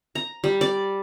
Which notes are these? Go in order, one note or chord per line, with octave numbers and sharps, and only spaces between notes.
A#5
G3
D5